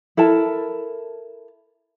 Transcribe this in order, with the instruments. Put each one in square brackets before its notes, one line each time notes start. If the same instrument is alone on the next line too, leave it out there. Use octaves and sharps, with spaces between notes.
[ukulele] E4 A4 A#4 A5